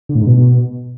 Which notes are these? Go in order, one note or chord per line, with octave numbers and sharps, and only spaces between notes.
D3
A2
G#2
B2